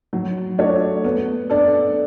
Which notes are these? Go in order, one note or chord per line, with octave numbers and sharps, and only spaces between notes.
F#3
A3 D4 F#4 C#5
B3
D4 A4 D5